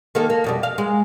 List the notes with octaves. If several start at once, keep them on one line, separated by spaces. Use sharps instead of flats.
D#3 A#3 A4
A#3
F2 B2 G3
F5
G#3